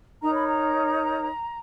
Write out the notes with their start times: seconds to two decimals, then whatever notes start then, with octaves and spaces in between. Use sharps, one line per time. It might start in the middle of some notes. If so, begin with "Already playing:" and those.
0.21 D#4 A#4 C#5 A#5
0.34 B5
0.47 A#5